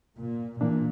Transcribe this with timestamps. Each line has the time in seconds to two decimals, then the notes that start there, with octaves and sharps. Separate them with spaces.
0.18 A#2
0.61 A#2 E3 A#3 D4